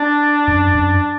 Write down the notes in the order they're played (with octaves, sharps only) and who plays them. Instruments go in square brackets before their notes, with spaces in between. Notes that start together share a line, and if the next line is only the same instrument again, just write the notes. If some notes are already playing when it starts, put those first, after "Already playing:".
Already playing: [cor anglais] D4
[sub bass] F#2
F#2